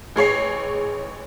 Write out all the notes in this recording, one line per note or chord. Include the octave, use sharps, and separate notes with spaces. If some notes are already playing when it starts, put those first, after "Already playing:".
A1 G#4 C#5 C7